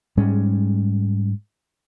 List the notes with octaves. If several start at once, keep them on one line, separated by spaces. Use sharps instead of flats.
G#2 G3 G#3 C#4